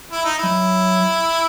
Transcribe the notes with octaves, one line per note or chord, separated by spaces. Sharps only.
E4
D#4
F#3 E4